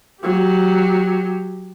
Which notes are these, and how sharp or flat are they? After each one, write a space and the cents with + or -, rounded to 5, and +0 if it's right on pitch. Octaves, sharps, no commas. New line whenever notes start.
F#3 +0 G4 +0